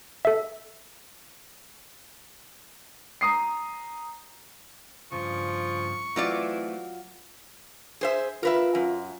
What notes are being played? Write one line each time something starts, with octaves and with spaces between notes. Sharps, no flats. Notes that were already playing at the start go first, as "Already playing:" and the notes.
A4 E5
A#5 D#6 C7
G2 C#3 F3 C#6
E3 F#3 A3 C4 E4 F4 D5
G#4 C5 E5
F4 A#4 B4 E5
F#2